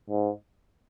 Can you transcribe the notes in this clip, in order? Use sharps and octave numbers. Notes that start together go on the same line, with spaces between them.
G#2